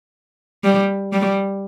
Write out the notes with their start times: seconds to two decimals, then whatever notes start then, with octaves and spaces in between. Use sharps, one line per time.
0.64 G3
1.13 G3